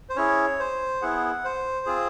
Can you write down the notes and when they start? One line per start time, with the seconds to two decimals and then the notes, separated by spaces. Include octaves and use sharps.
0.09 C5
0.16 C#4 E4 G#4 C#5
0.59 C5
1.02 B3 E4 G#4 F#5
1.45 C5
1.86 C4 F4 G#4